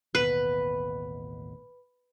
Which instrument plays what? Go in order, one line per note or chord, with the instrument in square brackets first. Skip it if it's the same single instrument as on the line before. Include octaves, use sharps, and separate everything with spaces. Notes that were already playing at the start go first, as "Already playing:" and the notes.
[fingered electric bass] A1 D#2 B2 [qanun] B4